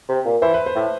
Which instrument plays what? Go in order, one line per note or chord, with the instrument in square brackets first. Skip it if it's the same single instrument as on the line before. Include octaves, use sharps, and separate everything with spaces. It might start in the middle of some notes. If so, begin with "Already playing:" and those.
[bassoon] C3
A#2
[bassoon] E3 [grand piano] C5
[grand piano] B4
C5
[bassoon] A2